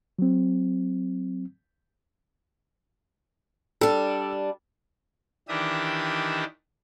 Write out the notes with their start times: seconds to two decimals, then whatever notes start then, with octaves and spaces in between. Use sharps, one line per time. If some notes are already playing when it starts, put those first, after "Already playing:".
0.19 F#3 C4
3.81 G3 D4 A4
5.48 D#3 E3 D4 G4 E5 D#6